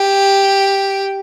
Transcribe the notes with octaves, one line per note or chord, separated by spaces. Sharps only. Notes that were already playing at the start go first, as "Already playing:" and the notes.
Already playing: G4